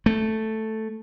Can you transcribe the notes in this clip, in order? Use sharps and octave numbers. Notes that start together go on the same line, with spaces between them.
A3